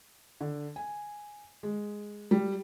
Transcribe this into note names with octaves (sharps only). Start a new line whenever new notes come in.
D3
G#5
G#3
G3